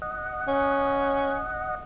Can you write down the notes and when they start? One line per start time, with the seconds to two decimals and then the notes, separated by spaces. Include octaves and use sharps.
0.02 D#5 F#5
0.48 C#4